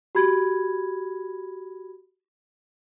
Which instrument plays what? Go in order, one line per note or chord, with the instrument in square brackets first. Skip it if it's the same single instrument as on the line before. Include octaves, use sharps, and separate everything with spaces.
[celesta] F#4 G4 B5 G#6